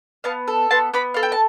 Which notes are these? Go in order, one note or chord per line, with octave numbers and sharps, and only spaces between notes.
B3 F5 A5
A4
B3 A5 C6
B3 B5 D6
A4 F5
G5
A5